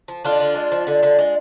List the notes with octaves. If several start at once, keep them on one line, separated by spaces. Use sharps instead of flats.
F3
D3 D4 F4
D3
G#3
F3
D3
D3
G#3